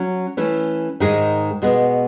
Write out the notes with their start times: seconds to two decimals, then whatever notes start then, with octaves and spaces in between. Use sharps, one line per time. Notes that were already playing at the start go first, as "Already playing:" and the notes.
Already playing: F#3 C#4
0.37 E3 A3 C#4
1.00 G#2 D#3 G#3 D#4 G#4
1.62 B2 G#3 B3